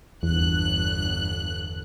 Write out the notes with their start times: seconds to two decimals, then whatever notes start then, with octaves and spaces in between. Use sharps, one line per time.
0.23 G1 E2 F#6